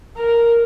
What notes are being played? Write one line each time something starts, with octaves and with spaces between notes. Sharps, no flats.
A#4